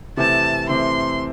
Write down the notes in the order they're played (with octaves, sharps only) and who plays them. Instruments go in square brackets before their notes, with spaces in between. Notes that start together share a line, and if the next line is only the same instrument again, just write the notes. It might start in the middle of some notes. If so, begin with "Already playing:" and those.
[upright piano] C3 E3 A3 C4 [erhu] A5
[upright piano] C3 E3 A3 C4 [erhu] C6